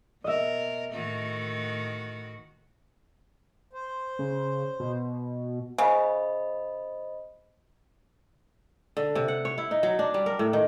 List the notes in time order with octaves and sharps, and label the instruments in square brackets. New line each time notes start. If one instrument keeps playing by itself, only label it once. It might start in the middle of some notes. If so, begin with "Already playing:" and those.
[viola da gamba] B2 A#4 [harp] D#5 E5
[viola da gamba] A2 D#3 F#4
[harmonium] C5
[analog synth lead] C#3
B2
[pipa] C#3 [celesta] C5 [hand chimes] D#5 B5
[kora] D3
C3
F#5
C#5
E4
D#4
F#3
D4
G3
A#4
A2
D#3